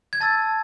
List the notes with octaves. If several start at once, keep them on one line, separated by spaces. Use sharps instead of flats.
G#6
A5 E6 A6